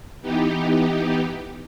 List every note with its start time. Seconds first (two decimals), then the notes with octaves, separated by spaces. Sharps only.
0.22 E3 B3 D#4 G4